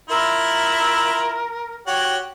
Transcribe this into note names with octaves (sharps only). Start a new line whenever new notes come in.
E4 F4 A#4 E5
F#4 G4 C#5